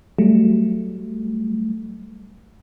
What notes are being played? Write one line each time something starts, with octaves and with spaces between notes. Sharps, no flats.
F#3 G3 A3